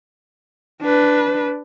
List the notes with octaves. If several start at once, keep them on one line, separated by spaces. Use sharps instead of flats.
D4 B4